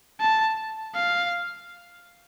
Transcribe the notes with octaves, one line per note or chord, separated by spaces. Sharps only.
A5
F5